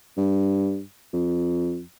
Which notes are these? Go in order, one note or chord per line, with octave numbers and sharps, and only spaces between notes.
G2
F2